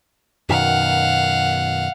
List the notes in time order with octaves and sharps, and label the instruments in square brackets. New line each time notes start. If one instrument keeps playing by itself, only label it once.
[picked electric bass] F#2 B2 D#3 [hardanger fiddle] F5 F#5